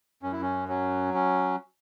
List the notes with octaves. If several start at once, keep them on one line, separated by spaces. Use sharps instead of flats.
F#2 C#4
E4
C#4
F#3 C#4
C#4